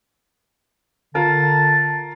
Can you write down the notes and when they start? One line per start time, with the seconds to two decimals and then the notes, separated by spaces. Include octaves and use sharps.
1.15 D3 F4 A#4 A5